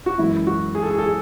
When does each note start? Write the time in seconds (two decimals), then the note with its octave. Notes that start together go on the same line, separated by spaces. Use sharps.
0.06 F#4
0.18 F#2 E3 G#3 E4
0.47 F#4
0.75 G#4
0.83 A4
0.91 G#4
0.98 A4
1.06 G#4